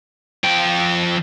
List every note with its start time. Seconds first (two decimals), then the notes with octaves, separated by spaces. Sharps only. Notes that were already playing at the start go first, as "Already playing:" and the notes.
0.44 F3 G5